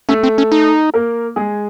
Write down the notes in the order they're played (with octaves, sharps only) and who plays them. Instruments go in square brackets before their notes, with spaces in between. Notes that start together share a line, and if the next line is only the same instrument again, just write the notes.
[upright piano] A3 A4 [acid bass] C#4
[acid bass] C4
C#4
D#4
[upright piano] A#3 A#4
G#3 G#4